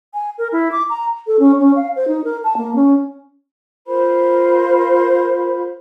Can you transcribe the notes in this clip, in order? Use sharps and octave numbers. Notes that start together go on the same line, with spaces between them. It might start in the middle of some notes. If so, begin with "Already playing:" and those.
G#5
A#4
E4
D6
A#5
A4
C#4
C#4
F5
C5
D#4
A#4
A5
A#3
C#4
F4 A#4 C5 B5